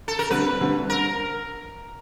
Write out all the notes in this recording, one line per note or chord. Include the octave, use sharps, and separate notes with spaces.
A4
A#4
D2 D3 G3 C4 B4
D2 D3 G3 C4
D3 A#4